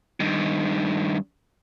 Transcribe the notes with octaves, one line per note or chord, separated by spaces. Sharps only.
G2 D#3